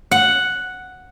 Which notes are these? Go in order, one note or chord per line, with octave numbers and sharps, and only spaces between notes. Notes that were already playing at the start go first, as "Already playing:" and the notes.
F#5